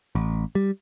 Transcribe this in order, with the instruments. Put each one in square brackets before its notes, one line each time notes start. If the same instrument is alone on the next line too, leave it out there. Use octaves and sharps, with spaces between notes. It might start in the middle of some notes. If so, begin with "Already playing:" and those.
[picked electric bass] A1
G3